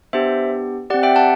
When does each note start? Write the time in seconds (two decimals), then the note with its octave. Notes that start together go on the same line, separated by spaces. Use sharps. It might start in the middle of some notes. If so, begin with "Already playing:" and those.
0.13 B3 D4 G4 C5 E5
0.90 C4 G4 D5 F#5
1.03 E5 G5
1.16 F#5 A5